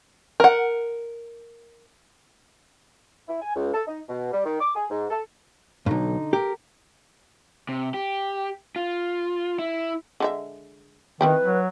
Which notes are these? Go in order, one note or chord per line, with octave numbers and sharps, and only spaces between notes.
A#4 F#5
E4
G#5
C#2
A4
D#4
B2
G3
D#3
D6
G#4
G#2
A4
B1 G2 D3 D#4
G4 A#4
C3
G4
F4
E4
D3 G#3 E5
D#3 C4 E4 B4 G5
F#3